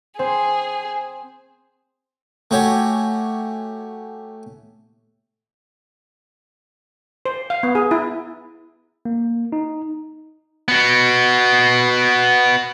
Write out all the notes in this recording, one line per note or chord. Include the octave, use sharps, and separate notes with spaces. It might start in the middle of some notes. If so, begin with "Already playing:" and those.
C4 G#4 C5
A3 F#4 G4 C#5 G#5
C5
F5
B3
G#4
E4
A#3
D#4
B3 F#4